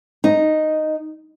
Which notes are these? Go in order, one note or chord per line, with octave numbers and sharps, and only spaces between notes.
D#4